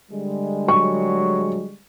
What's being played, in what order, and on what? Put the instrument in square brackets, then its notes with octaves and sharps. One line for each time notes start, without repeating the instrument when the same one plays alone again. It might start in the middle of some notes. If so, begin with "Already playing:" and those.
[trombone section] D3 G3 G#3
[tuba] F#3 [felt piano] C#6